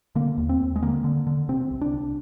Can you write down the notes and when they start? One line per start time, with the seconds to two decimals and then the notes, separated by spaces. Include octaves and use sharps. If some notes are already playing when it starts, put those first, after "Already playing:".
0.15 D3 A#3
0.37 D#2
0.49 C4
0.60 D#2
0.76 G#3
0.82 D3 A#3
1.04 D3
1.27 D3
1.49 C3 C4
1.71 C2
1.81 D4
1.93 C2